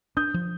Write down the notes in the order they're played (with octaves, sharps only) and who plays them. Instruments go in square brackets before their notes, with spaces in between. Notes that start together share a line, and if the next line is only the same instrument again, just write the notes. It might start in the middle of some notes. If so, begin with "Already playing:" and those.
[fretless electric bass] D4 [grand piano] D#6 G6
[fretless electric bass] F3